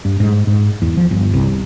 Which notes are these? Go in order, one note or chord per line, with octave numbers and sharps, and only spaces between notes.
G2
G#2
G#2
E2
F3
G1
C2